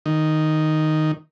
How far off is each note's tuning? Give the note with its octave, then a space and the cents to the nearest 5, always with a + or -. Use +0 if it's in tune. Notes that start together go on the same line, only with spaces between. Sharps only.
D#3 -5